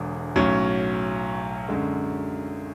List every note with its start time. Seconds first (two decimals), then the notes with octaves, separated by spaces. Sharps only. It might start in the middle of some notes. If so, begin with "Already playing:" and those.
Already playing: E1 E2 D3 G#3
0.36 B1 A2 F#3 C#4
1.68 F#2 D3 G#3